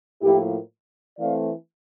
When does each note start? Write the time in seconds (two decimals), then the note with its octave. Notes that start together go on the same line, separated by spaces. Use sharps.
0.22 A2 F3 A#3 E4 G4
1.17 E3 A3 C4 D5 F5